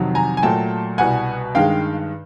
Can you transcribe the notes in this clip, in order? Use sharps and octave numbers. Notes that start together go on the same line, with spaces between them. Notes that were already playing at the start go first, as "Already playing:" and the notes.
Already playing: F2 C3 D#3 F#3
G#5 A#5
G#5
A#2 F#3 A3 G5 A5
C2 B2 G3 F#5 G#5
G2 D#3 G#3 F5 G5